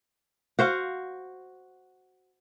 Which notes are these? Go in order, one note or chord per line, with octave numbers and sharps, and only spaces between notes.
F#4 C5 F5